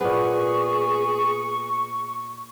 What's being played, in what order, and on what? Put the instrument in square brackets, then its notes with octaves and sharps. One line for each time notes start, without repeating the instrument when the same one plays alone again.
[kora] A#2 B3 [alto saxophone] G#4 [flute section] C#6